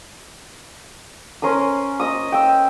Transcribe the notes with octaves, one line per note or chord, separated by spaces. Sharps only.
C#4 A#4 C6 D#6
D#5 D#6
G5 E6